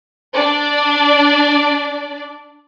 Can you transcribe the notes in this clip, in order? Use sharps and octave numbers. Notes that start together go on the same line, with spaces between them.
D4 D5